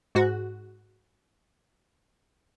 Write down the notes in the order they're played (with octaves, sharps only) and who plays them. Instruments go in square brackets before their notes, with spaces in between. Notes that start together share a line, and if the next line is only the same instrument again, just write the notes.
[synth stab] G#2 F#4